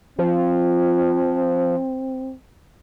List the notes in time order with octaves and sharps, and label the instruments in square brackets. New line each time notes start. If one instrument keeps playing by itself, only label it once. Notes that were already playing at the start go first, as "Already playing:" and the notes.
[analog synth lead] F3 [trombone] C4